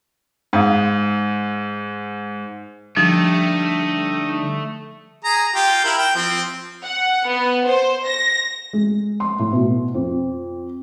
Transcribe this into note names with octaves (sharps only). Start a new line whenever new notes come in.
G#2 F5 D#6
D3 F3 G3 A3 D#4
G#4 A#5
F4 G4
E4 A#4
G5
F3 C4
F#5
B3
C5
A#6
G#3
C6
A2
B2
F2